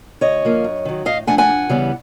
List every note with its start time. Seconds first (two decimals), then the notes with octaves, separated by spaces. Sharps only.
0.21 D2 C#5 D#5
0.42 D3 F3 A#3
0.64 F#2
0.85 D#3 F#3
1.05 A2 D#5 F5
1.27 F3 A3 D4 F#5 G#5
1.38 F#5 G#5
1.49 F2
1.69 C#3 E3 G3 B3